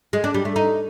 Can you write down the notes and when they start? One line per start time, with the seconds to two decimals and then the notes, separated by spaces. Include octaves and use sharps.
0.13 G#3
0.24 D4
0.34 G3
0.45 A3
0.56 D#4